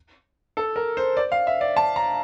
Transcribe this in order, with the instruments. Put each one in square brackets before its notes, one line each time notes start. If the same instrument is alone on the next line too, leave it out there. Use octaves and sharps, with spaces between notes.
[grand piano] A4
A#4
C5
D5
F5
E5
D5
A5
A#5